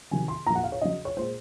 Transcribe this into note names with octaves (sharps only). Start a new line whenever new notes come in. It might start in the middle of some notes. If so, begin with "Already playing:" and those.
C3 D#3 F#3 G#5
C6
A#2 F#3 A#5
F#5
F5
C#5
C#3 F#3 D#5
C#5
A#2 G#3 C5